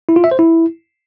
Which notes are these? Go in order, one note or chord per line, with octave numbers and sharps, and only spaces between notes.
E4
F4
E5
C5
E4